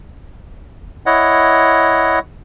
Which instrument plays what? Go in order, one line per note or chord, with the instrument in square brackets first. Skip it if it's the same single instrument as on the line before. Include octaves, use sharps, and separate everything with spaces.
[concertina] E4 C#5 D#5 F#5